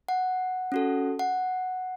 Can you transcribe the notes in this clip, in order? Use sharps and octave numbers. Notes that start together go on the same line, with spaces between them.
F#5
C#4 F#4 A4
F#5